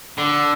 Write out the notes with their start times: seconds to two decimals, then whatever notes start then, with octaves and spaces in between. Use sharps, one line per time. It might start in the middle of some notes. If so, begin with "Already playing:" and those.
0.18 D3